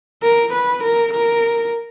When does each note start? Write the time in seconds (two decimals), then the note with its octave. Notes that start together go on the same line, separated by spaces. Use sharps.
0.23 A#4
0.53 B4
0.84 A#4
1.14 A#4